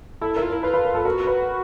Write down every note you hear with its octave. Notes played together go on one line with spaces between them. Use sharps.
E4 A4
E4 A#4
F4
E4 A#4
F4 B4
B4
A#4
A4
F#4 A#4
B4